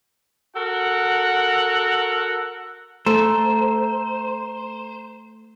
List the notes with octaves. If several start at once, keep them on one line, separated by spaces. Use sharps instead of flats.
F#4 A4 A#4 F#5
A3 C5 A#5